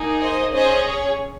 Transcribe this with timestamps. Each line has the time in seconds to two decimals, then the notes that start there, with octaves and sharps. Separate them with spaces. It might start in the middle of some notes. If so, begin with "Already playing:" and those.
Already playing: A#3 D#4 G#4
0.21 C5 D#5
0.53 C#4 G#4 C5 D#5
0.86 C#5